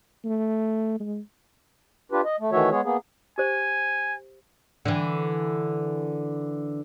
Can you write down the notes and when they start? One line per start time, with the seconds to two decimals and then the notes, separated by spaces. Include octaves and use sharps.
0.24 A3
1.00 G#3
2.12 D4 F4 G4 B4
2.25 D#5
2.40 A3
2.52 D#3 E3 A3 F#4 C#5 E5
2.71 G#3 B3 G#4 C#5
2.84 A#3 B3 G#4
3.38 G4 C5 G#5
4.85 D3 E3